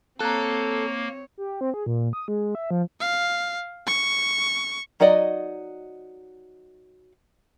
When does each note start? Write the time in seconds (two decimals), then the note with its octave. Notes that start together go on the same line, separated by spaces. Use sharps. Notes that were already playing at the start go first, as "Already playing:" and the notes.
0.21 A#3 C4 A4 C#5 A#5 F#6
1.38 G4
1.61 C4
1.74 G#4
1.86 A#2
2.13 D#6
2.28 G#3
2.55 E5
2.71 F3
3.00 F5
3.86 C#6
5.00 F#3 D#4 F#4 D5 D#5